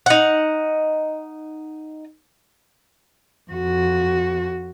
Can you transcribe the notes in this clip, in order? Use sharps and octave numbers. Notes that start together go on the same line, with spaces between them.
D#4 F#5
F2 F#4